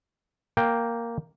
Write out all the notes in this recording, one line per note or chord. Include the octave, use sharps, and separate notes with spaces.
A#3 G5